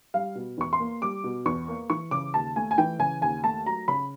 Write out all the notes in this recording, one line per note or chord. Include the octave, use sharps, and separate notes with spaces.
G3 F5
B2
E2 C#6
C6
A#3
G3 D6
B2
E2 C#6
A#3
E3 C#6
C#3 D6
D#2 A5
A3 G#5
G#5
E3 G5
C#3 G#5
D#2 G#5
A3 A5
F#3 A#5
C#3 B5